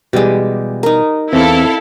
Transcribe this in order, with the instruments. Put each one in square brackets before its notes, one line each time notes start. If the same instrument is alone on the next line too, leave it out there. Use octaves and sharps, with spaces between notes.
[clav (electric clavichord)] B2 E3 G3 [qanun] G#3 G4
[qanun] D#4 A#4
[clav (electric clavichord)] E2 E3 [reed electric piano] C4 [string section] E4 A4 F5